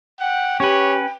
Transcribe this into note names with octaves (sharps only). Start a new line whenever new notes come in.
F#5 G5
C#4 G4 B4 C#5